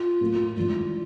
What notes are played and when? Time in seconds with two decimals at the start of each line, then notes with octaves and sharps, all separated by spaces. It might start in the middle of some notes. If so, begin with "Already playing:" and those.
Already playing: F4
0.21 A2 F#3 A#3
0.56 G#1 G2 E3 F4